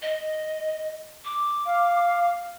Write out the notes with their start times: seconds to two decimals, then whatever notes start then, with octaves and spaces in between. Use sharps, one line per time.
0.02 D#5
1.25 D6
1.66 F5